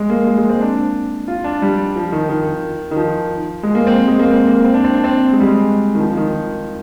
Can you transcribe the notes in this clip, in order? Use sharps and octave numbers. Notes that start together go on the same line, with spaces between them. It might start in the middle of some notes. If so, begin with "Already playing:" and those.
Already playing: G#3
A#3
G#3
G#3
C4
D4
F4
D4
G3
F3
D#3
D#3
D#3
F3
G#3
A#3
C4
G#3
A#3
C4
A#3
C4
D4
C4
D4
C4
G#3
G3
G#3
D#3
F3
F3
D#3